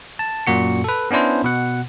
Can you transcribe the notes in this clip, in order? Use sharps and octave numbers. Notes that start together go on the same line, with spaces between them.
A5
F#2 A#2 F#4 C#7
A4 B4
B3 C#4 D4 E4 C5
B2 F#5